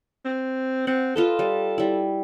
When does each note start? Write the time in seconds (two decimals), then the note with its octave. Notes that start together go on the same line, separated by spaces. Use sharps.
0.25 C4
0.87 C4 F#5
1.16 F4 A4 B4 D#5
1.39 G3
1.78 G3 E4